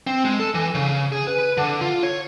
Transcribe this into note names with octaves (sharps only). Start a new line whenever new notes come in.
C4
G#3
A4
E3
C#3
G#4
B4
D3
F4
C#5